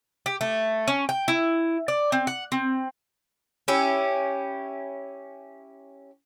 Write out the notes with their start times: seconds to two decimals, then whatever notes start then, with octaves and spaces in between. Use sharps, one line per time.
0.26 G4
0.41 A3
0.88 C#4
1.09 G5
1.28 E4
1.88 D5
2.12 C4
2.27 F#5
2.52 C4
3.68 C#4 E4 G4